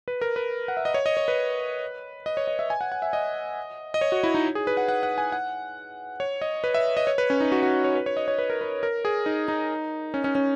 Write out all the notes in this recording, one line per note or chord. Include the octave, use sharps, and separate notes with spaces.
B4
A#4
B4
F#5
E5
D#5
C#5
D#5
C#5
B4
D#5
C#5
D#5
E5
G#5
F#5
F#5
E5
D#5
D#5
C#5
F#4
E4
D#4
G#4
B4
F#5
F#5
F#5
G#5
F#5
C#5
D#5
B4
E5
D#5
C#5
B4
C#4
D#4
F#4
F#4
C#5
B4
C#5
D#5
C#5
B4
A#4
B4
A#4
G#4
D#4
D#4
C#4
C#4
C#4